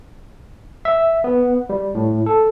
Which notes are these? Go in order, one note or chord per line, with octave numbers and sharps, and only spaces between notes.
E5
B3
G3
A2
A4